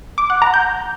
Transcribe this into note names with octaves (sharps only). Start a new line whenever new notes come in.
D6
F#5
A#5
G6